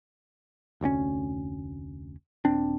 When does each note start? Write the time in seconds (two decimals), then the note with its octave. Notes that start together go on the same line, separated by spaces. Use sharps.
0.81 F1 D2 C4 C#4
2.45 D#1 C4 D4